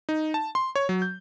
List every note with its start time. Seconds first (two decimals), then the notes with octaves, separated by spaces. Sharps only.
0.09 D#4
0.34 A5
0.55 C6
0.75 C#5
0.89 F#3
1.02 G6